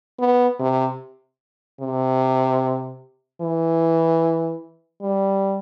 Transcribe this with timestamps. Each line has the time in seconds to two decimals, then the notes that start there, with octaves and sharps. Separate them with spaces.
0.19 B3
0.59 C3
1.81 C3
3.41 E3
5.02 G3